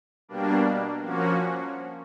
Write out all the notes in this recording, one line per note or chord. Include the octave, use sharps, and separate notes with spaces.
B2 G3 A#3 D4
F3 A#3 C#4 F#4